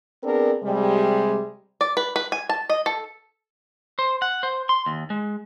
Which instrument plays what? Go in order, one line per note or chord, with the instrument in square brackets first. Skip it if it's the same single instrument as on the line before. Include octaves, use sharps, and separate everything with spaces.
[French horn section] B3 C4 D4 G#4 A#4
C3 G3 G#3
[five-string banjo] D5
B4
B4
G#5
A5
D#5
A4
[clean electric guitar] C5
F#5
C5
C6
D#2
G#3